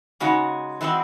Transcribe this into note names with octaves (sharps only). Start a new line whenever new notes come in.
C#3 G#3 D#4 F#4
E3 G#3 C4 F#4